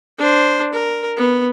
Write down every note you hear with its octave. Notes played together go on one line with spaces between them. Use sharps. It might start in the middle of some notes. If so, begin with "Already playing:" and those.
D4 C5
A#4
B3